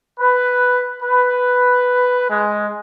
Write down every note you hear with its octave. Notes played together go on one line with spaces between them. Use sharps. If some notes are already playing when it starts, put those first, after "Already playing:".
B4
B4
G#3